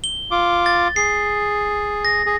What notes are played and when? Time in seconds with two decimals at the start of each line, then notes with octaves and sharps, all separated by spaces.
0.04 G7
0.31 F4 D6
0.66 A6
0.96 G#4 C7
2.05 A#6
2.26 G#4